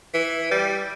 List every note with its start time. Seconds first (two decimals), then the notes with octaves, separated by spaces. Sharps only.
0.14 E3
0.51 G3